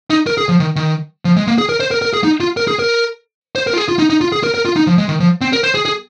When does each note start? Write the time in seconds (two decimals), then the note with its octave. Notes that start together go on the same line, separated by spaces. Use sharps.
0.10 D#4
0.27 A#4
0.38 G#4
0.49 F3
0.60 D#3
0.76 D#3
1.25 F3
1.36 G#3
1.47 A#3
1.58 G#4
1.69 A#4
1.80 C5
1.91 A#4
2.02 A#4
2.13 G#4
2.24 D#4
2.40 F4
2.57 A#4
2.68 G#4
2.79 A#4
3.56 C5
3.67 A#4
3.73 F4
3.78 G#4
3.88 F4
3.99 D#4
4.10 D#4
4.21 F4
4.32 G#4
4.44 A#4
4.54 A#4
4.65 F4
4.76 D#4
4.87 F3
4.98 G#3
5.09 D#3
5.20 F3
5.41 C4
5.53 A#4
5.64 C5
5.74 G#4
5.85 G#4